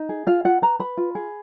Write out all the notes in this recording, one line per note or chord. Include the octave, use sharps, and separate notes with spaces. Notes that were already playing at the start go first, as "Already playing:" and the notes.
Already playing: D#4
G#4
F4 F5
F4 F#5
B4 A#5
B4 B5
F4
G#4